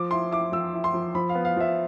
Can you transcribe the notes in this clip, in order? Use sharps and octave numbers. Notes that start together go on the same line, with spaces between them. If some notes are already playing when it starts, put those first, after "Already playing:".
Already playing: F3 D6
E4 C6
E4 D6
F3 E6
E4
C6
F3
F3 B5
F5
B3
F5
F3 E5